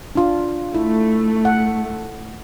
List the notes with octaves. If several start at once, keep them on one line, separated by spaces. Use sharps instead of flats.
D4 F4
A3 E4
F#5